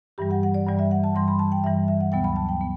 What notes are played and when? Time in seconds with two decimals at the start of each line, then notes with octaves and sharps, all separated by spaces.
0.18 G2 E3 G3 G4
0.31 F#5
0.43 F#5
0.54 D5
0.66 G2 E3 G3 D5
0.79 E5
0.91 F#5
1.04 A5
1.15 G2 E3 G3 C6
1.28 B5
1.39 A5
1.52 G5
1.64 G2 E3 G3 E5
1.88 E5
2.01 F#5
2.12 D2 C3 F#3 B3 G5
2.24 B5
2.36 A5
2.49 G5
2.61 B3